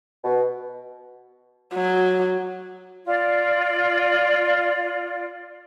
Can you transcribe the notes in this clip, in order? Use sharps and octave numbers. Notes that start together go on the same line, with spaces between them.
B2
F#3
F4 D5